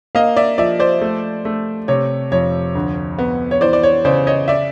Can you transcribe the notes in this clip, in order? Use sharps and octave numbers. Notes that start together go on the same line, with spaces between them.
A#3 D#5 F5
D5 E5
F3 D5 E5
C5 D5
A3
A3
C3 C#5
F2 C#5
D2
B3
C#5
E3 C5 D5
D5
C#5
C#3 C5 D5
C#5 D#5
D5 E5